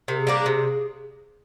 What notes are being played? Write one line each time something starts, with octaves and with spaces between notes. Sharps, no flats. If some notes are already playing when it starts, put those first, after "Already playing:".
C3 A#4
G#4
G3 A#3 D4 G4
G#4
C3